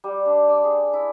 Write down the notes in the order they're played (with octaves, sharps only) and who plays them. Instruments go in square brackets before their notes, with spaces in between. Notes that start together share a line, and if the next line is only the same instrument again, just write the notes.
[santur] G3
D4
D5
G#4
E4